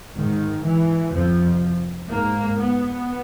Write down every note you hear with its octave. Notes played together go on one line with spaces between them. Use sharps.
G#2 D#3
E3
F2 C3 F3
G#2 A#3
B3